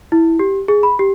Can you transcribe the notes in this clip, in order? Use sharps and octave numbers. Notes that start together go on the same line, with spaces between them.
E4
G4
G#4
B5
G4